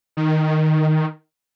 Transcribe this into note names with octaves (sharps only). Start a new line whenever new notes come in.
D#3